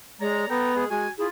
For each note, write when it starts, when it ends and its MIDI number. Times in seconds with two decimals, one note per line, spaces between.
0.20 0.48 56
0.20 0.47 73
0.20 0.47 74
0.20 0.47 82
0.49 0.85 59
0.49 0.73 69
0.49 0.73 79
0.49 0.73 82
0.74 0.87 56
0.74 0.87 68
0.90 1.07 56
0.90 1.09 66
0.90 1.09 80
1.18 1.28 64
1.18 1.28 65
1.18 1.27 68